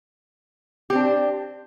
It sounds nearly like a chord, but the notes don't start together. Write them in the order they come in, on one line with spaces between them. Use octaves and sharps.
G4 C4 D4